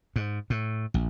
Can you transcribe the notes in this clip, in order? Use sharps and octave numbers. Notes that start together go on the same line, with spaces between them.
G#2
A2
A#1